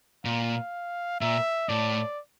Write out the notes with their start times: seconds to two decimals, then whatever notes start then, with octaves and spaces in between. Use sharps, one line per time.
0.25 A#2 F5
1.21 A#2 E5
1.69 A2 D5